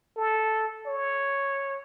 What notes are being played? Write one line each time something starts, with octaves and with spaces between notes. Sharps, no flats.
A4
C#5